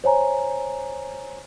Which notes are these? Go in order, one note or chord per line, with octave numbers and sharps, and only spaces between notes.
C5 C#5 G#5 A#5